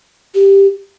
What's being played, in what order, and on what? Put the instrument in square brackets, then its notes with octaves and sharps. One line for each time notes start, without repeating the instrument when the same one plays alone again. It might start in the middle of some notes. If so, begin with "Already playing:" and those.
[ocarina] G4